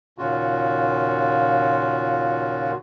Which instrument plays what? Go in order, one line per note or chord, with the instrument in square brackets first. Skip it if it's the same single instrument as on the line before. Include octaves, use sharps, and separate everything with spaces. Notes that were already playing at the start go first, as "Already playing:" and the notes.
[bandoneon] D#2 A#2 C#3 F4 F#4